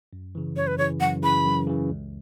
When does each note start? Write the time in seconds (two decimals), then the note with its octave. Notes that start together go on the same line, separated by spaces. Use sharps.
0.13 F#2
0.35 C#3 E3
0.56 F#2 C#5
0.67 B4
0.78 C#3 E3 C#5
1.00 F#2 F#5
1.23 C#3 E3 B5
1.45 F#2
1.67 C#3 E3
1.89 C#2